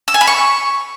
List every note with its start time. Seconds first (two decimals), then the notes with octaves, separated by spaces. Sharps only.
0.08 E6
0.14 G#5
0.21 B5
0.27 C#6